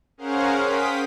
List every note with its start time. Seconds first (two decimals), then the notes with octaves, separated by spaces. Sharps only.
0.18 C#4 G#4 A#4 C5 F5 F#5
0.57 F5 G5 D#6 B6